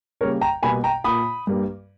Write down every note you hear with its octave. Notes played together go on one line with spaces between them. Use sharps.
C#3 G3 A#3 A#4 C#5
G5 A#5
B2 G3 A#3 G#5 B5
G5 A#5
A#2 A#3 B5 D#6
G2 G3 A#3